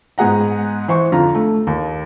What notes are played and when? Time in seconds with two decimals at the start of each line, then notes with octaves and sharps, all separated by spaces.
0.18 G#2 B3 G#4 F#5 A#5
0.88 E3 C5 C#6
1.12 F2 D3 F4 A#5
1.35 A3
1.67 D#2